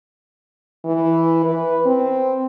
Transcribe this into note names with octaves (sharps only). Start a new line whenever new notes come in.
E3
B4
C4